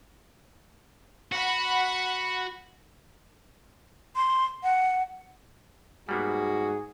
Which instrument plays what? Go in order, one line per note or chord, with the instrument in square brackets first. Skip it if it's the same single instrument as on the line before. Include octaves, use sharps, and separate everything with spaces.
[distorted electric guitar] F#4 [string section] F#5 B5 F#6
[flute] C6
F#5
[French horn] G#2 [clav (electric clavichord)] G3 A#3 B3 [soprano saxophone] F#4 [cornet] G#4